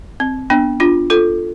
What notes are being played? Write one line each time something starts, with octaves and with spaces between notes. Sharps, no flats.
C4
B3 D4
D4 F4
F4 A4